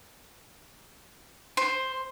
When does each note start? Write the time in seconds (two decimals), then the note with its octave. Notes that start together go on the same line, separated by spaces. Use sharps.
1.57 C5